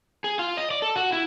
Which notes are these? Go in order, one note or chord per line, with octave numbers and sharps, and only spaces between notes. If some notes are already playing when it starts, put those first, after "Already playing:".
G#4
F4
D#5
D5
A4
F#4
E4